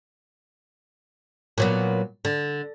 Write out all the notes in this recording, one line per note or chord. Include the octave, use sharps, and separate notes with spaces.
A#2 F#3 B3
D3